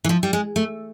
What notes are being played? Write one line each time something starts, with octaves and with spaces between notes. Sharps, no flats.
E3
F3
G3
G#3
A3